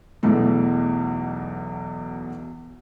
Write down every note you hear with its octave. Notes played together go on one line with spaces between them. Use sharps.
B1 E2 B2 E3 A3